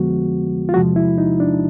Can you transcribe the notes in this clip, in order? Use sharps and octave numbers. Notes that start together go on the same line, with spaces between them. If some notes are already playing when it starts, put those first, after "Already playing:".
Already playing: F2 D3 F3 G#3 B3 F#4
F4
E2 C3 F3 G#3 F#4
E4
D#4
D4